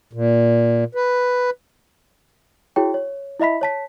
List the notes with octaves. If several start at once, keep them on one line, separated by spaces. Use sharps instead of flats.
A#2
B4
E4 F#4 G#4 C#5 G5
C#5
E4 D#5 E5 B5 B6
C#5 A5 B6